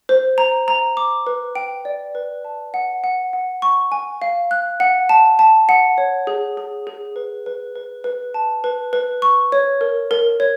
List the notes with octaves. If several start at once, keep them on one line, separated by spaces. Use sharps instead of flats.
C5
A#5
A#5
D6
B4
G5
D5
B4
A5
F#5
F#5
F#5
C#6
G#5
F5
F#6
F#5
A5
A5
F#5
C#5
G#4
G#4
G#4
B4
B4
B4
B4
A5
B4
B4
C#6
C#5
A#4
A#4
C#5